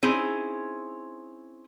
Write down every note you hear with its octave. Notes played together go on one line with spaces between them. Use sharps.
C4 C#4 D#4 E4 G#4